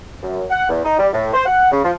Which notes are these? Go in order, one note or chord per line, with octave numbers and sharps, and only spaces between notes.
F#2
F#5
E2
D#4
G3
A2
C5
F#5
C#3
F3